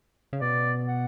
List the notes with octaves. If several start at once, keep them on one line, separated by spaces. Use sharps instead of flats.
C#3
B2 D5
F#5